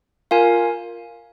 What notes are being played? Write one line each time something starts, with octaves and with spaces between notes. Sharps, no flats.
F4 A#4 F5 G#5